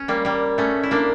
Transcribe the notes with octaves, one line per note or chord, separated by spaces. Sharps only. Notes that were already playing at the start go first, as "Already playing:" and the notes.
Already playing: C#4
G3 A#3
G3 A#3
A3 C#4
E4
A#3 D4